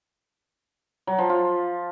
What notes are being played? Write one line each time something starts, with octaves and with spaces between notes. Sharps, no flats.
F#3
F3
F4